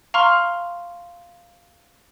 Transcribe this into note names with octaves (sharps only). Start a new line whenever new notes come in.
F5 A#5 C6 C#6 F6